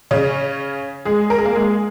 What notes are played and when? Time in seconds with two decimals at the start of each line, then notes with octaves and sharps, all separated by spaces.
0.11 C#3 C#4
1.05 G#3 G#4
1.30 A#4
1.38 G#4
1.45 A#3 A#4
1.56 G#3 G#4